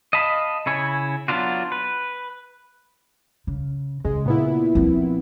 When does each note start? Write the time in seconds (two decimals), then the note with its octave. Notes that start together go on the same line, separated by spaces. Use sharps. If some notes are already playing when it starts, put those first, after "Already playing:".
0.13 D#5 F5 A5 B5
0.66 C#3 E4 C#5 G#5
1.28 F#3 B3 D4 F4 F#4
1.72 B4
3.47 C#3
4.05 C#3 G#3
4.26 A#2 B3 E4
4.75 F3 C4